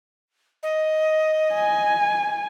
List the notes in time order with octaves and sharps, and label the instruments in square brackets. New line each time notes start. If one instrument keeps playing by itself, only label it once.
[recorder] D#5
[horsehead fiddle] G#5